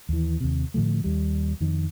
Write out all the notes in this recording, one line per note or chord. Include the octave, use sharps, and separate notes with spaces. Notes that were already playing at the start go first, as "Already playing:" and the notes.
D#2 E3
D#2 C3
A2 D3 F3 A3
D#2 G3
F2 D#3